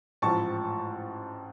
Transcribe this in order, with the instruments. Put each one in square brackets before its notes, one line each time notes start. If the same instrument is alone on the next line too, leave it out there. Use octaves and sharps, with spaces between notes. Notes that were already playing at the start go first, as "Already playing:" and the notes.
[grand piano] A1 G#2 F3 A5 C#6